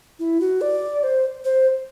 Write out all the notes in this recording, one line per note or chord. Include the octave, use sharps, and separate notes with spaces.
E4
F#4
D5
C5
C5